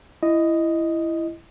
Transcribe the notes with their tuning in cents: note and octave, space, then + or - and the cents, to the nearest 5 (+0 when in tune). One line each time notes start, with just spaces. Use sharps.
E4 +10 D#5 +0